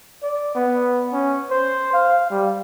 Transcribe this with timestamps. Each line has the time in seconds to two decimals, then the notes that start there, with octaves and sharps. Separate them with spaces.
0.22 D5
0.55 B3
1.12 C#4
1.50 C5
1.93 F5
2.30 G3